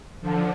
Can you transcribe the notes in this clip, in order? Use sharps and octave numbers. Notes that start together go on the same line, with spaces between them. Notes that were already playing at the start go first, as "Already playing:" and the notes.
D3 F3